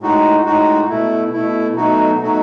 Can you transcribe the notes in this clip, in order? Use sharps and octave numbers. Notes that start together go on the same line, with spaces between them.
A2 G#3 D#4 F#4
A2 G#3 D#4 F#4
B2 A3 E4
B2 A3 E4
B2 F#3 A3 D#4 F#4
B2 F#3 A3 D#4 F#4